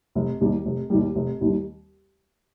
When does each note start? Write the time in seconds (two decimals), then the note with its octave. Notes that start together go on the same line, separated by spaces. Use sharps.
0.15 F1
0.41 D#2 D#3 G3
0.65 F1
0.90 D#2 D#3 G3
1.16 F1
1.41 D#2 D#3 G3